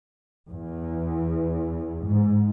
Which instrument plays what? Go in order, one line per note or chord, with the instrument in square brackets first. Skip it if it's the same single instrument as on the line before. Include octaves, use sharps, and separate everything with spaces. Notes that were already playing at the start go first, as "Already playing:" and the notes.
[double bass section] E2
G#2